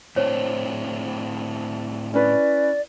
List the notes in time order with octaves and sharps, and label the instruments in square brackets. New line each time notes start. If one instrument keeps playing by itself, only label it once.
[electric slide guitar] A2 C4 D4 [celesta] C5 C#5
[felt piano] C#4 E4 B4 [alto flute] D5